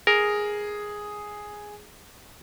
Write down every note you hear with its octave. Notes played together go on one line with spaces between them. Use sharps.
G#4 A#4